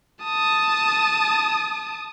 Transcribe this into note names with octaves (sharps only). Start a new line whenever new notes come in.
A5 D#6